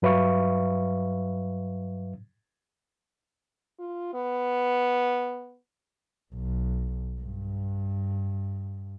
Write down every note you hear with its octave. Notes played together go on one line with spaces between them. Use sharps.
G2 F#3 B4 E5 F5 C#6
F4
B3
B1
G2